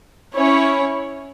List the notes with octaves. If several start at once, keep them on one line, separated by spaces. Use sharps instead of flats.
C#4 E4 C#5